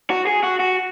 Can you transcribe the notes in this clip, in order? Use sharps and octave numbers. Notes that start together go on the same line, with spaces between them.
F#4
G#4
F#4
F#4